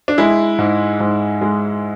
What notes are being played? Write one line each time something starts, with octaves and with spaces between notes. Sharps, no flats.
D4
G#3 E4
G#2
G#2
G#3